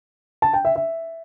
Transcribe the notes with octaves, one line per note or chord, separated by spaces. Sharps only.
A5
G5
E5
E5